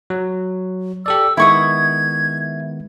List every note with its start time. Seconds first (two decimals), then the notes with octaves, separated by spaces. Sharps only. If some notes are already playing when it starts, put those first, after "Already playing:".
0.10 F#3
1.06 G4 A4 D5 E6
1.37 D#3 G#3 B3 E4 C#6 D#6 G#6